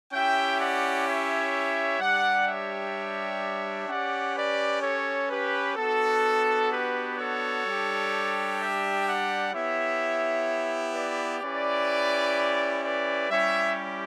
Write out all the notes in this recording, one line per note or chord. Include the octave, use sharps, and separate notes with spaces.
C#4 E4 G4 E5 G5
D5 F#5
C#5 E5
G3 D4 G4 D5 F#5
C#5 E5
C#4 G4 D5 F#5
B4 D5
A4 C#5
G4 B4
B3 D4 F#4 A4
G4 B4
A4 C#5
G3 D4 G4
E5 G5
D5 F#5
B3 E4 G4 C#5 E5
B4 D5
C#4 E4 G4 B4 D5
B4 D5
G3 C#4 E4 G4 C#5 E5